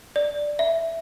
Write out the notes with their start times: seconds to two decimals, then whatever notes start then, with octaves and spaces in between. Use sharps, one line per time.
0.16 D5
0.59 E5